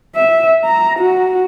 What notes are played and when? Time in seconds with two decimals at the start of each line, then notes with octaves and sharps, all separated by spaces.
0.15 E5
0.64 A#5
0.99 F#4